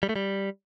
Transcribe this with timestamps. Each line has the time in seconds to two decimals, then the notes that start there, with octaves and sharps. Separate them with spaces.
0.03 G3
0.09 A3
0.16 G3